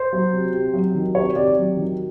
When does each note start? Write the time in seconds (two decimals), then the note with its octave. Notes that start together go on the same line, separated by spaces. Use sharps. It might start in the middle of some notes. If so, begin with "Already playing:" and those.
Already playing: C5
0.13 F#3
0.33 C3
0.53 C3
0.74 F#3
0.95 D#3
1.15 C3 C#5
1.36 C3 D5
1.57 F#3
1.77 D#3